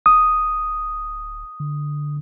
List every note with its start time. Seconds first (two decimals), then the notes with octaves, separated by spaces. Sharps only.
0.06 D1 D#6
1.60 D3